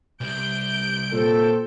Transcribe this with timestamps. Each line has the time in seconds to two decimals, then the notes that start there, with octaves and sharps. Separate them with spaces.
0.21 C2 G6 D7
1.13 A#2 C4 A4